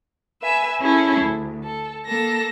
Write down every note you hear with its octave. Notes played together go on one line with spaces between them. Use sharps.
B4 E5 G#5
C#4 E4 G#4 A4
D2
A4
A#3 A4 A#6